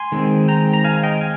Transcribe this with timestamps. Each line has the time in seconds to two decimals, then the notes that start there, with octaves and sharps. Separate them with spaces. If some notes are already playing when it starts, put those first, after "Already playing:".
Already playing: G#5 C6
0.12 D#3 G#3 C4
0.48 G5 A#5
0.74 A#5
0.85 F5 G#5
1.03 D#5 G5
1.21 F5 G#5